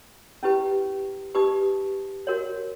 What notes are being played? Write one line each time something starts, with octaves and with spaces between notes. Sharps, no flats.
C#4 E4 G4 B4
D#4 G4 B4 D#6
F#4 A#4 C#5